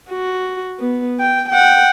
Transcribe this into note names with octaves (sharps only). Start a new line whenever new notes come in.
F#4
B3
G5
F#5 G5